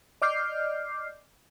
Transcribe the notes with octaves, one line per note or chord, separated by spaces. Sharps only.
D5 D#5 D6 F6 G6 C7